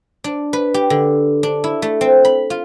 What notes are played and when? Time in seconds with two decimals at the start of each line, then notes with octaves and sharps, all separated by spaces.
0.24 D4
0.53 B4
0.74 G4
0.90 D3
1.43 D4
1.64 E4
1.82 A3
2.01 C4
2.25 B5
2.50 F4